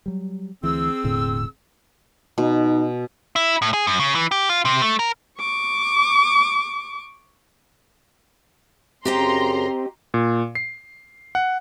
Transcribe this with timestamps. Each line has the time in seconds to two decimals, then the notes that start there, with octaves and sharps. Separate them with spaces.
0.06 F#3 G3
0.63 D2 E3 C4 G#4 E6
1.04 E1 A2 D3
2.38 B2 D#4
3.36 E4
3.62 A2
3.74 G#4
3.87 F#2
4.00 C#3
4.15 E3
4.31 G4
4.49 F4
4.65 C3
4.82 A3
4.99 A#4
5.39 C#6 D6
9.05 F#2 C#3 C4 G4 D#5 G5 A#5 C6
10.14 A#2
10.55 C7
11.35 F#5